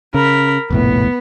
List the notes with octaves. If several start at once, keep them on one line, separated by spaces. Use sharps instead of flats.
C#3 A#4 B5
F1 A#1 A2 B3